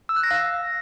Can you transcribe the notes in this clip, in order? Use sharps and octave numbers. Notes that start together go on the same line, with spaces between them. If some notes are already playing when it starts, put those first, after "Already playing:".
E6
F#6
A#6
F5